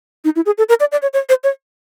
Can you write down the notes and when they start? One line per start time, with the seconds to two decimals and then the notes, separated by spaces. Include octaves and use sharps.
0.25 D#4
0.36 E4
0.46 G#4
0.58 A4
0.69 A#4
0.80 D5
0.92 D5
1.02 C#5
1.13 C#5
1.29 C5
1.44 C#5